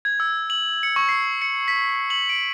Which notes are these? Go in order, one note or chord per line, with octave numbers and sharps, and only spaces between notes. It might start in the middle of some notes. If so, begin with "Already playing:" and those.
G#6
E6
F#7
C#7
C#6
C7
C#7
B6
F#7
D7